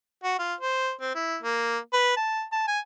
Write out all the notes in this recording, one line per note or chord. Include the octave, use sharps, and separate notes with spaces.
F#4
F4
C5
C4
E4
A#3
B4
A5
A5
G#5